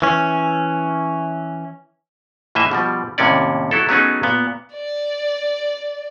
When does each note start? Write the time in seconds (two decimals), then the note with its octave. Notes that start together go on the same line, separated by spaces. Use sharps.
0.02 E3 C#4
2.55 A2 E3 A#3 D#5 E5 G#5
2.71 B2 F3 G3
3.18 D#2 A2 C3 A#3 C#4 D5
3.71 F#3 E4 A4
3.89 F#3 A3 B3 C#4 D#4 G#4
4.23 A#2 B3
4.74 D5